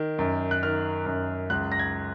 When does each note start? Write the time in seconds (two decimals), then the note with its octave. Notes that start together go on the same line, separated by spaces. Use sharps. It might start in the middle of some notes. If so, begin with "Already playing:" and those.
Already playing: D#3
0.19 F#2
0.51 F#6
0.63 D#3 F6
1.06 F#2
1.50 C#2 F#6
1.72 A#6
1.79 G#6